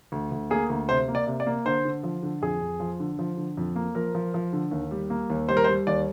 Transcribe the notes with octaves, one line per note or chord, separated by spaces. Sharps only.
D2
D2
A#3 G#4
D2
C3 C5
A#3
D5
C3
D5
A#3
D3 C5
D3
F3
D3
F2 G#4
F2
F3
D3
F3
D3
F2
A#3
F3 A#4
F3
F3
D3
D#2
G3
A#3
D#2
G3 C5
A#4
C5
G3
D#2 D5